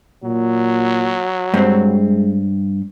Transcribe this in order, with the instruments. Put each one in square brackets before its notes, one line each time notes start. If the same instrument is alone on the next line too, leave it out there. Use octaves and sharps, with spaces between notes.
[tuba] A#2 [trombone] F#3
[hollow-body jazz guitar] G2 C4 [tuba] G#3